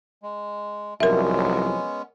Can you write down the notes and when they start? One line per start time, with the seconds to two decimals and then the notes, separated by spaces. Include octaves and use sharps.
0.22 G#3
1.00 C2 F3 F#3 G#3 B3 C#4 A#4 E5